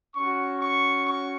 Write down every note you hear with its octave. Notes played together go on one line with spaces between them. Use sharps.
C#4 F#4 C#6
C#6
C#6